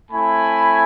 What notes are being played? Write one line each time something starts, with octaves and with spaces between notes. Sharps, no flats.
A3 C4 E4 G#5 B5